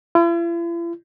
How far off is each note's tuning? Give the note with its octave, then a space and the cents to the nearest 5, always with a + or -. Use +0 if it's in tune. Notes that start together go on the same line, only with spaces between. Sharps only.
E4 +45